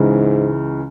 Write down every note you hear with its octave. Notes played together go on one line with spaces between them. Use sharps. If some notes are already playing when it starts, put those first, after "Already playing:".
Already playing: C#2 G#2 C#3 E3